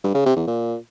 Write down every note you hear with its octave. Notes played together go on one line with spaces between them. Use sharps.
G2
C#3
C3
E2
A#2